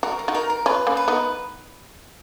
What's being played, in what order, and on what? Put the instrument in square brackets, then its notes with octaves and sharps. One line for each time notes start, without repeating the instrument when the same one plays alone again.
[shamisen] F#4 [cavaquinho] A#4
[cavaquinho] A#4
[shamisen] D#4 F#4
[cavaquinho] A#4
A#4
[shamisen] C#4 F4 [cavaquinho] B4
[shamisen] A#3 C#4
[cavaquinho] B4
[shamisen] B3 D#4